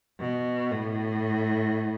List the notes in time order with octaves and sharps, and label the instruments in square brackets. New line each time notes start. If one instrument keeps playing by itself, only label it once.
[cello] B2
A2